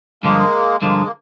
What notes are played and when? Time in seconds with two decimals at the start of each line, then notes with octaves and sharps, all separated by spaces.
0.23 G2 D3 F3 G#3 A#3
0.82 G2 D3 F3 G#3 A#3
1.06 A#3